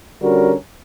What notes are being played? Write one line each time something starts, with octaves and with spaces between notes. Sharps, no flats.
D3 G3 C#4 F#4 A#4